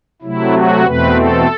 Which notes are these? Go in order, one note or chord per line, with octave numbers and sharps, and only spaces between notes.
C3 F#3 A3 E4
F#4
E2 B2 A3 C4 B4
A4